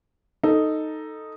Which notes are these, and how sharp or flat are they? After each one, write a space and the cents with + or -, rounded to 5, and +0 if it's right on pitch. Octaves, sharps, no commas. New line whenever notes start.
D#4 +0 A4 +5